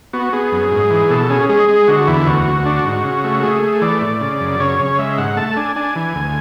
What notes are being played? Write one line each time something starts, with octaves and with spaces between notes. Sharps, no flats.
B3 F#4
B3 G#4
F#2
G#2
E3
B2 A4
C#4 G#4
G#3 G#4
G#3
D3 F#4
E2 E4
D2 F#4
D2
D4
G#2
C#3
A3
A3 G#4
A3
E3 D5
A2
C#3
F#2
C#3 C#5
C#3
G#3 E5
G#2 F#5
A3 A5
D4 G#5
D4 G#5
E3
D2